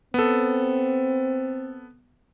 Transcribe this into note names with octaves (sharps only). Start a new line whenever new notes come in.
B3 C4 A4